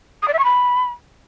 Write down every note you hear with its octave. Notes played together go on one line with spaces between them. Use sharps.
D#6
D5
E5
C#6
B5